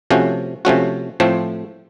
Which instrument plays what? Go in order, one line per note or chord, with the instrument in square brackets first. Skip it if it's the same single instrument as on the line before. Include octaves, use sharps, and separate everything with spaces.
[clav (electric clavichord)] C3 F3 A3 C#4 F#4
C3 F3 A3 C#4 F#4
A2 F3 A3 C4